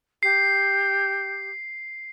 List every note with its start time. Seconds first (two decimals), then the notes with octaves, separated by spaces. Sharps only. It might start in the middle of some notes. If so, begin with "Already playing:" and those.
0.23 G4 C7